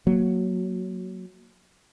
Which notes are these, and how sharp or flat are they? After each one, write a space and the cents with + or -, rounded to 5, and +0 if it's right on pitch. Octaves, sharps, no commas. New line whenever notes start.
F#3 +0 A#3 +0